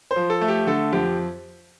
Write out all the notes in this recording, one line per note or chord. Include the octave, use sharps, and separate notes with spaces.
C5
F3
A4
A3
G4
D3 A4
F2 G4